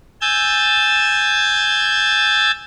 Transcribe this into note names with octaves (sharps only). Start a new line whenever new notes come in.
G#5 E6 G6 A6